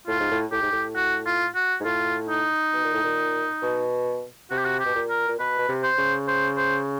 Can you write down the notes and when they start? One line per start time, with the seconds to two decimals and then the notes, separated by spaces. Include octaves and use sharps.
0.07 A2 F4
0.20 G#2
0.31 A2
0.52 A2 G4
0.62 G#2
0.72 A2
0.96 F#4
1.26 F4
1.55 F#4
1.80 G#2
1.85 A2 F4
2.29 D#4
2.73 B2
2.84 A#2
2.94 A2
3.03 A#2
3.62 B2
4.51 C3 F#4
4.58 G4
4.65 F#4
4.80 G4
4.85 B2
4.95 A#2
5.10 A#4
5.28 A#2
5.39 B2 B4
5.58 B2
5.68 C3
5.83 C5
5.98 C#3
6.28 C5
6.57 C5